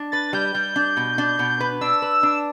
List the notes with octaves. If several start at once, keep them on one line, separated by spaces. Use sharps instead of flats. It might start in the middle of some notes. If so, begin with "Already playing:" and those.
Already playing: D4
B4 A6
G3 G6
G3
D4
B2
D4
B2
B4
D4 E6
B4
D4